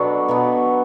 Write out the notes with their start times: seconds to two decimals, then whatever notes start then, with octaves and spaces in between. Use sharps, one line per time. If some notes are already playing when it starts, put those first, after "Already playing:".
Already playing: B2 F#3 B3 D4 F#4 A4
0.28 B2 F#3 B3